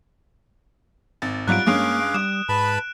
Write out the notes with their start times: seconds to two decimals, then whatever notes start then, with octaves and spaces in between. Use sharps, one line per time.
1.22 G#1 A6
1.47 G#2 F#3 G3 F4 F#6 D7
1.66 G2 G#3 A#3 C#4 G#4 F5 D6
2.14 G3 D#6 F#6 E7
2.49 G#2 B4 A5 B5